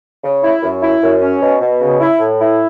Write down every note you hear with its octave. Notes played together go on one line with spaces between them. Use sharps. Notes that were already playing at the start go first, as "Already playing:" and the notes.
C#3
E4
F#2
E4
F#2
C#4
B2
B2
C#3
E4
A2
E4